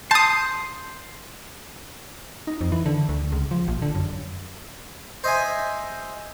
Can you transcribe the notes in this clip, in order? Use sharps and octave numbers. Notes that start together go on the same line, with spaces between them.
A5 C6 D#6 G6
D#4
F2
E3
D3
D2
C#2
F3
A#1
D3
F#2
C5 D#5 E5 G#5